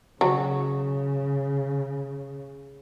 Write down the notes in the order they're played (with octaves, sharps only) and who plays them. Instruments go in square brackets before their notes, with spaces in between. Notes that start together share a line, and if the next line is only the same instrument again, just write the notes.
[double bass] C#3 [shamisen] F#3